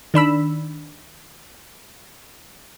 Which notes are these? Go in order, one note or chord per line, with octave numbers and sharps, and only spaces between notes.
D#3 D4 B5 E6